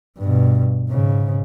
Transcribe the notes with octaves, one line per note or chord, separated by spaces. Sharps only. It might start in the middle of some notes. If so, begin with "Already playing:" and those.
G2 B2
G#2 C#3